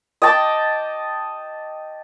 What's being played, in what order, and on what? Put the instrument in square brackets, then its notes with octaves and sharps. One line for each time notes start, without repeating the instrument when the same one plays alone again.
[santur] D#5 G5 A5 D6